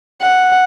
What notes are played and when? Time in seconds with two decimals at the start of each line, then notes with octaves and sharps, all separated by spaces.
0.22 F#5